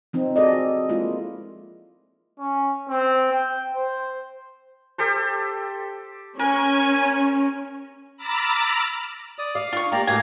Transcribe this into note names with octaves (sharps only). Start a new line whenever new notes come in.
F3 C4 D#4
F#4 G#4 A4 D5 D#5
G#3 A#3 E4 F4
C#4
C4
G5
C5
G4 A4 C5
C#4 A#4 G#5
A#5 B5 D6 E6 F6 A6
D5 D#6
D5 F5
D4 F4 C#6
A#3 G4 D5 A#5
A2 F#3 A3 A#3 F5 G#5 A#5